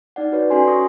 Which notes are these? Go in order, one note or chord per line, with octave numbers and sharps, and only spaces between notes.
D#4 D5 F#5
F#4 B4 C#5 D5
C#4 F#4 A4 G#5 C6
C#6 D#6 A#6